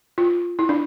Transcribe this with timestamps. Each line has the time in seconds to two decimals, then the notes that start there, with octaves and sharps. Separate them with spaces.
0.18 F4
0.59 E4
0.69 D4